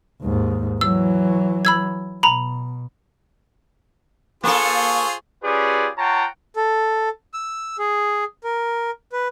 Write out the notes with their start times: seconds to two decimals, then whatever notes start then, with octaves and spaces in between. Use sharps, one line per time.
0.22 D#2 G#2
0.81 E3 F#3 E6
1.65 B5 E6 G#6
2.23 B2 A#5 B5
4.44 A#3 F4 G#4 A4 C5 C#6
5.43 C#4 F4 G4 G#4 B4 D5
5.98 F4 C#5 F#5 G5 A5 A#5
6.56 A4
7.34 E6
7.79 G#4
8.44 A#4
9.12 B4